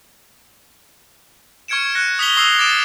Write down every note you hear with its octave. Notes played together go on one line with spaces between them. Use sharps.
C#6 F6 G#6 C#7 D7 E7
F#6 A#6 C#7
D#6 B6 F7 G7
C#6 D#6 E6 C7 F7
D6 A6 C7 D7 E7 F7